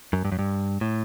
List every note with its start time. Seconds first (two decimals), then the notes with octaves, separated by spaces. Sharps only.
0.13 F#2
0.25 G2
0.32 F#2
0.39 G2
0.81 A2